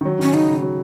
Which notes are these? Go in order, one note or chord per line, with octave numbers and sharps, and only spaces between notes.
D#3
F#3
D#3 C#4
C#3 D#4
C#3
F#3